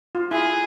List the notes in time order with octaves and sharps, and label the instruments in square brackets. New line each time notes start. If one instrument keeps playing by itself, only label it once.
[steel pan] F4
[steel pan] E4 [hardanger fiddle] G#4